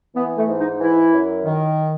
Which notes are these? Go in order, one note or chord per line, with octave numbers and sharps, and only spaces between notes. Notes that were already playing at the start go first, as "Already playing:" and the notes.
E3 B3
A3
G#2
D#4
E3 E4
F#2
D#3